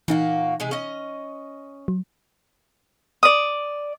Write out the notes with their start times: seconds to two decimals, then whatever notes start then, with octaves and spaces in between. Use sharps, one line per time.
0.08 A#2 E3 A#3 D#4 F#4
0.60 C3 G#3 G#4
0.71 C#4 D#5
1.88 F#3
3.23 D5 D#6